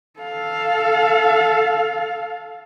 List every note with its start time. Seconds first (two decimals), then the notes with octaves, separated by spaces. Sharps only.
0.20 A4 F5